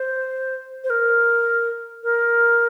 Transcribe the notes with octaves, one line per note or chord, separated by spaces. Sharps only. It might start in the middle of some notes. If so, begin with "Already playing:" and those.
Already playing: C5
C5
A#4
A#4